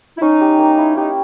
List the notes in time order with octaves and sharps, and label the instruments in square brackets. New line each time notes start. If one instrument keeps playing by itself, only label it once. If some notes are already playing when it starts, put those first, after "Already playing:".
[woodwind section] E4
[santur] C#4 [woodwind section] D#4
[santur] G4
A#3
E4
[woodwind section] D#4 [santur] G4